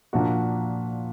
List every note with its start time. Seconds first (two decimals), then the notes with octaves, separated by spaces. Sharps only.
0.13 A#2 F3 A#3 D4 F#4